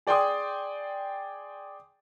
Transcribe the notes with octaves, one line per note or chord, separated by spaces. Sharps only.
G#4 D5 G5 G#5 C6 D#6